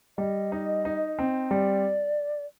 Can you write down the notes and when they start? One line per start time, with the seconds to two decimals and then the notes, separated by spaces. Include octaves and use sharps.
0.18 G3 D#5
0.52 D#4
0.85 D#4
1.19 C4
1.51 G3 D5